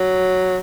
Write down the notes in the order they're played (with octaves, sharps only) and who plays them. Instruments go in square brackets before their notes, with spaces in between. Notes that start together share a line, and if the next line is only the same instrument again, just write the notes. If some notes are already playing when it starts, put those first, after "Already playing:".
Already playing: [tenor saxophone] F#3